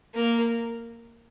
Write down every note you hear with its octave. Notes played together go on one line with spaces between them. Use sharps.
A#3